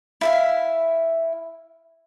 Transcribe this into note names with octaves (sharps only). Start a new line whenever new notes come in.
E4 E5 F5